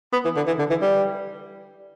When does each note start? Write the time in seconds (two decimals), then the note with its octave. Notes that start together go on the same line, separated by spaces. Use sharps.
0.13 B3
0.24 E3
0.36 D3
0.47 E3
0.59 D3
0.70 E3
0.81 G3